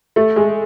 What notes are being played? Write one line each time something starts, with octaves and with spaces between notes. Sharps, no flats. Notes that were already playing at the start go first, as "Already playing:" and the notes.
A3
G#3